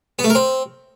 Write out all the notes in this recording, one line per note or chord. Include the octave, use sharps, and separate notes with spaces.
B3
A3
A#4
C4